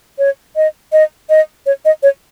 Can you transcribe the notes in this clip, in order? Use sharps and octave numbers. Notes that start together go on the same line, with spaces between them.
C#5
D#5
D#5
D#5
C#5
D#5
C#5